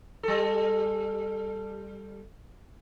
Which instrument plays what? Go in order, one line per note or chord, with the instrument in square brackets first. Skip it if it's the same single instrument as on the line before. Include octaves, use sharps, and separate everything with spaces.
[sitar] G3 A4